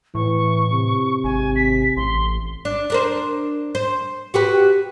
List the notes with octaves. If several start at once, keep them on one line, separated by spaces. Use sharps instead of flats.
A2 E3 C#6
C3
G#1 G#5
B6
A1 C6
D4
D4 A#4 C5
C5
F#4 G4 B4